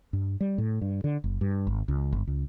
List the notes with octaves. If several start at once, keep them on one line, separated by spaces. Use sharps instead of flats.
G2
G3
A2
G2
D3
F#1
G2
G#1
C#2
G1
C#2